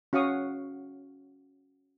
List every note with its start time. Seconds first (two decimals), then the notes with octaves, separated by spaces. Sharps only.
0.13 C#4 F#4 F5 C#6 D#6